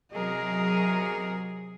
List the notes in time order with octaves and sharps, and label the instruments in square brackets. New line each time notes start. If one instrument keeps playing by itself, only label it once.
[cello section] C3 F#3 G#4 [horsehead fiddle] A#4 D#5